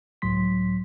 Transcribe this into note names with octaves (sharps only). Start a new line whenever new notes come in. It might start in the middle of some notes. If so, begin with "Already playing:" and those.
C#2 A2 F#3 C6 B6